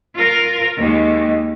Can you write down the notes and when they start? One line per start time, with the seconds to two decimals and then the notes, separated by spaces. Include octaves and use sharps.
0.15 F4 A#4
0.77 D#2 G#3